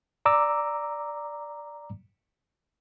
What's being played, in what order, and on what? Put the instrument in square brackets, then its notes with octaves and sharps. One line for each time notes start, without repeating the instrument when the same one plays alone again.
[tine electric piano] D5 A#5 D6 E6